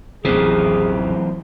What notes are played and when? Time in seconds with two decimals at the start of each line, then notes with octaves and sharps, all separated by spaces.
0.25 A1 D#2 C3 E3 F#3 C4 G#4